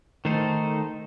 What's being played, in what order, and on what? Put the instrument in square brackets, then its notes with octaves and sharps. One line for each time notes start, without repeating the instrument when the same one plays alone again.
[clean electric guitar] D#3 A3 D#4 A4 C5